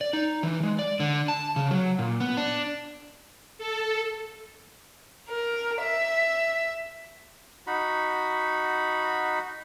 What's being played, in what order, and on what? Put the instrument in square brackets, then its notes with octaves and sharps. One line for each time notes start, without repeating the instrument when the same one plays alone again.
[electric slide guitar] D5
D#4
E3
G#3
D5
D3
A5
C#3
F#3
A#2
B3
D4
[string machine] A4
[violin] A#4
E5
[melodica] D#4 F#4 B5